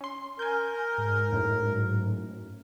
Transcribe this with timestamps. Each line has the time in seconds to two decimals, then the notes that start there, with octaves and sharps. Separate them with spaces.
0.01 C#4 C6
0.39 A#4 G#5 G6
0.98 G#2
1.33 F#2 A2